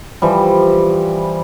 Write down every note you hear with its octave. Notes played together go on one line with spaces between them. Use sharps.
E3 F3 G3